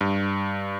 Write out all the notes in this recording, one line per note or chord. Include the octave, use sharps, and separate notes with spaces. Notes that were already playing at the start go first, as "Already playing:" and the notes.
G2